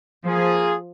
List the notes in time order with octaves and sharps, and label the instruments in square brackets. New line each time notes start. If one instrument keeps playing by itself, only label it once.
[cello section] F3 [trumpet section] A#3 F4 G#4